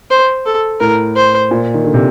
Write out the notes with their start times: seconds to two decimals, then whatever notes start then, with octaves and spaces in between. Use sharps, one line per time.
0.10 C5
0.46 A4
0.80 A2 A#4
1.16 C5
1.51 A#2
1.74 D#3
1.84 D3
1.94 C3